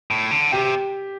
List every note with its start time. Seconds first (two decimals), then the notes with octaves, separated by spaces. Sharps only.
0.11 A2
0.31 D3
0.52 C3 G4